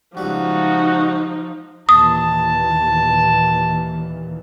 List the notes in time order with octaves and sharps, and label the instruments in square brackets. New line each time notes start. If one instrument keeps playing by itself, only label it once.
[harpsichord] C#2 G3 [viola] F3 D#4 [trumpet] F#4
[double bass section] D#2 A#2 E3 [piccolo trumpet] A5 [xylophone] D#6